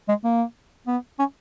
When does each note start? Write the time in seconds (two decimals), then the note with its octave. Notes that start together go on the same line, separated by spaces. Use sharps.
0.09 G#3
0.24 A#3
0.87 B3
1.19 C#4